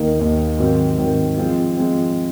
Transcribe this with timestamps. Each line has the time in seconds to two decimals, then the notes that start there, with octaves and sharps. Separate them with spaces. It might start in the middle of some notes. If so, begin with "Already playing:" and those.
Already playing: D#2 D#3 A#3 D#4
0.19 D#2 D#3 A#3 D#4
0.58 G#2 D#3 F#3 C4
0.98 G#2 D#3 F#3 C4
1.38 F3 G#3 C4
1.77 F3 G#3 C4